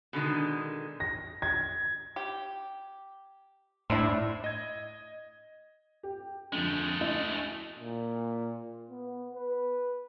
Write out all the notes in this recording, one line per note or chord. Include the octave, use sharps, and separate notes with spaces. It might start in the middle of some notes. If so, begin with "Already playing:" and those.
B2 D3 D#3 G#3
A#6
G#6
G4
A2 C4 D4 E4
D#5 G#6
G4
F2 D3 G#3 A3
D2 E4 D#5
A#2
B3
B4